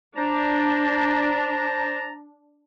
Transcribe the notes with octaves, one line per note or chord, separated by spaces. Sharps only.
D4 C5 A5 A#5